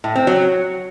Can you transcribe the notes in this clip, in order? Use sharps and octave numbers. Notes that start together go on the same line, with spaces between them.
A2
C4
F#3